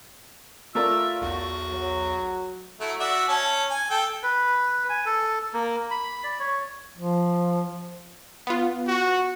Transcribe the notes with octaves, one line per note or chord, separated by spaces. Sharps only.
A3 F4 A#4 D5 E5 E6
B1 E2 F#4
F#3
F#3 A3 E4
F#4 D5 E5
C#4 A5
G#5
A4 G5
B4
G#5
A4
A#3
B5
D5
C#5
F3
B3 F4
F#4